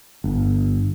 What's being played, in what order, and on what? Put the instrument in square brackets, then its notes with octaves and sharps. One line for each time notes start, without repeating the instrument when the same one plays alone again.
[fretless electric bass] G1